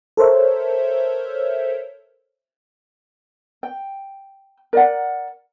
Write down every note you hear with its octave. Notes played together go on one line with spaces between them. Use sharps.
A4 A#4 C5 C#5 E5
G5
A#4 D5 F#5